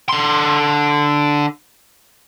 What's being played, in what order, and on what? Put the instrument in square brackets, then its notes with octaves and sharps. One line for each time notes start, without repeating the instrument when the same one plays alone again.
[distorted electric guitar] D3 C6